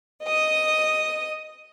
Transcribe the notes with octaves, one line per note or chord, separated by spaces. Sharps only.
D#5 D#6